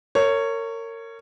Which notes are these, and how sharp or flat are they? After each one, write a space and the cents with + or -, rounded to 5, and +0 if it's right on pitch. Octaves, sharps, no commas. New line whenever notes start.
A#4 -30 C#5 +0